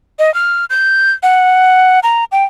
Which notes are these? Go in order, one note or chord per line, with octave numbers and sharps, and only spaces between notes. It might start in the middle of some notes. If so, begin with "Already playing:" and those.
D#5
F6
G6
F#5
A#5
G5